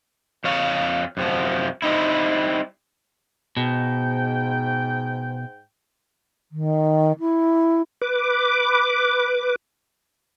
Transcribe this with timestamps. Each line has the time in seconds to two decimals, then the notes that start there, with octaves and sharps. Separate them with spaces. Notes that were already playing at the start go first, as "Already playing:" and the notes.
0.44 F2 C#5 F5
1.17 F#2 C3 F3
1.82 G3 C4 D#4 E4
3.57 G#2 B2 G5
6.52 D#3
7.20 E4
8.02 B4 D6